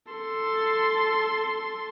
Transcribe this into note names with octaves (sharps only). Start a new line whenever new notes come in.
A4 C6